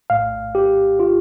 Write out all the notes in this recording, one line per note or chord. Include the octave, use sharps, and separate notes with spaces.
A#1 A2 A3 F5
G4
F4